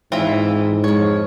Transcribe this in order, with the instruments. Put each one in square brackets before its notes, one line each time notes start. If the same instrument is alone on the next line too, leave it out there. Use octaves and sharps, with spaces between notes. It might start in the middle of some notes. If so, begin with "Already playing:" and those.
[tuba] G#2 [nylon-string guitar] E3 [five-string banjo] C4 F4 E5
[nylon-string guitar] F2 G#3 [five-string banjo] C#5